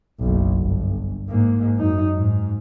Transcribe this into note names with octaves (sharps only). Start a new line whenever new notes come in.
F#1 B1
G1
G#2 A#3
F#2 D#4
G#2